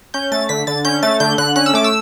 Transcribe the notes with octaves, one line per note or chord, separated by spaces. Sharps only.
C#4 G6
A3 A6
D3 B6
D3 A6
C#4 G6
A3 A6
D3 G6
D3 F#6
C#4 F#6
E6
A3 D6
E6